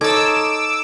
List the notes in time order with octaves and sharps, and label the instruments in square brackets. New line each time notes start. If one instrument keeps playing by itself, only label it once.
[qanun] D#4 A4 C#5 [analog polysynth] D6 E6